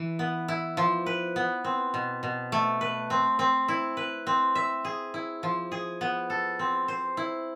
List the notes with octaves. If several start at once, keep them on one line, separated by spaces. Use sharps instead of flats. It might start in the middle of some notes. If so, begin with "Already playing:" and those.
Already playing: E3 E4
B3
E4
F3
B4
B3
C4
B2
B2
A3
B4
C4
C4
E4
B4
C4
E5
G#4
E4
F3
G#4
B3
A4
C4
C5
E4